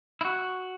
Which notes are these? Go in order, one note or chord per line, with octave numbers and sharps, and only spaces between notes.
E4
F#4